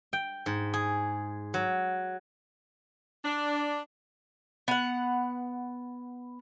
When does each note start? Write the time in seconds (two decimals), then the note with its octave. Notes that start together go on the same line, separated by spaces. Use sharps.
0.13 G5
0.46 G#2
0.74 G#4
1.54 F#3
3.25 D4
4.68 B3 F#5